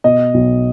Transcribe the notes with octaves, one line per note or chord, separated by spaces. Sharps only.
B2 D#5
B1